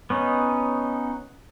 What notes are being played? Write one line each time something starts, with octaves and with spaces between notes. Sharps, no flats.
B3 C#4 D#4